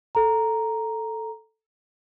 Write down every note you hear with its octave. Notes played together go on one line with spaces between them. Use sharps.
A4 A#5